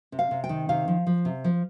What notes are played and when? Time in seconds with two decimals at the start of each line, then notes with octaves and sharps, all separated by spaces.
0.12 C3
0.19 F5
0.31 C3
0.44 G5
0.49 D#3
0.69 C3 F5
0.88 F3
1.07 F3
1.25 C3
1.44 F3